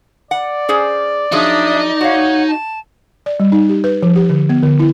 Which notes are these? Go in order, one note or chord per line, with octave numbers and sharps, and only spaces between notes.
D5 F#5
C#4 G#4 C5
F3 F#3 D4 D#4 G#4 E5 D#6
F#4 C#5 F5 F#5
A5
D5
G3
D#4
G4
B4
F3
G4
D3
B3
D3
E4